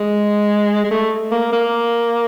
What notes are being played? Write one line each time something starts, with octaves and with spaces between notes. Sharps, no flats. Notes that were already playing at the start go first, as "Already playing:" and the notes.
Already playing: G#3
G#3
A3
A#3
A#3